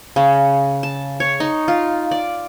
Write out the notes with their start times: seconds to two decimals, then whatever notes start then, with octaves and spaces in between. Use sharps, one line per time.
0.16 C#3
0.83 A5
1.20 C#5
1.40 D#4
1.68 F4
2.11 D5